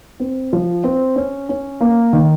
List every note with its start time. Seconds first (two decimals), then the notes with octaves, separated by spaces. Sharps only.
0.20 C4
0.53 F3
0.84 C4
1.16 C#4
1.49 C#4
1.81 A#3
2.13 D#3